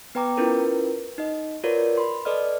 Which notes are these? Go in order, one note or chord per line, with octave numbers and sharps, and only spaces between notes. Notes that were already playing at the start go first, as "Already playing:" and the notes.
B3 B4 G5 A#5 D6
C#4 E4 F4 A#4 B4
D#4 D#5
F4 F#4 A#4 B4 C#5 D5
B5 C6
A4 B4 D5 D#5 F6